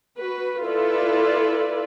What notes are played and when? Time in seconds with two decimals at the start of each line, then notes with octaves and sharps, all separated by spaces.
0.17 F#4 B4
0.63 E4 F4 A4 B4 D5